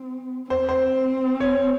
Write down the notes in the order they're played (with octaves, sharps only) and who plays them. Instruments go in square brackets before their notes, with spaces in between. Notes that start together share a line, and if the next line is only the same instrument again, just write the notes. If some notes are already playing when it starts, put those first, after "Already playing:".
Already playing: [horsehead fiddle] C4
[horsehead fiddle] C4 [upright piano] C5
[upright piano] C5
C#5